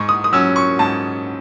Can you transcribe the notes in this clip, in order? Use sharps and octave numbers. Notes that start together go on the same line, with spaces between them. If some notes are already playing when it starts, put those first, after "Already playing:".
Already playing: G#2 C#6
D#6
D#6
F#3 C#4 E6
C#6
G#2 A5